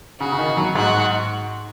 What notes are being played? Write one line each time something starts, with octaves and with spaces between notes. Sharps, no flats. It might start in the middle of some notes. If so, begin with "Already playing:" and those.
C#3 F#4
C#3
D#3
F#3
G#2 F#4